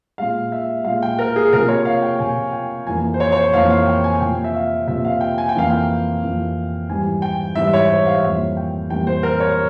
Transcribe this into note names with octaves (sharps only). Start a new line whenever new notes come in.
A#2 G#3 F5
E5
A#2 G#3 F5
G5
A#4
G#4
C3 F3 A#3 A#4
C#5
F5
G5
C3 F3 A#3 G#5
G5
F2 E3 A#3 G#5
C5
C#5
C#5
C5
F2 E3 A#3 F5
F5
G5
G#5
C3 F3 A#3 G5
E5
F5
C3 F3 A#3 E5
F5
G5
G#5
G5
F2 E3 A#3 F5
G5
F2 E3 A#3
G#2 E3 G3 G#5
G5
G#2 E3 G3 E5
C#5
C5
F5
E5
F2 E3 G3 A#3 F5
G5
F2 E3 G3 A#3 G5
C5
A#4
C#5